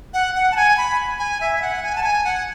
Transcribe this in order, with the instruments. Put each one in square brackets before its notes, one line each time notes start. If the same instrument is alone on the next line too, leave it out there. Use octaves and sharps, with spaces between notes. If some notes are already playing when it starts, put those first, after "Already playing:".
[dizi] F#5
F#5
A5
G#5
B5
G#5
E5
E5
F#5
G#5
A5
G#5
F#5